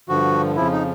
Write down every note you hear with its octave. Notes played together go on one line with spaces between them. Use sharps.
G2 D3 F3 F#4
F2 C#3 F3 E4
D#4